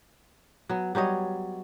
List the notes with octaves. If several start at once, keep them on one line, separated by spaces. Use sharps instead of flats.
F#3 B3
F#3 G3 C#5 D#5